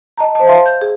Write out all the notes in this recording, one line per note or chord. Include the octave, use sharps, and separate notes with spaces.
D#5 A5 A#5
C5 A5
E5 F5 A5 C6
G6
G#4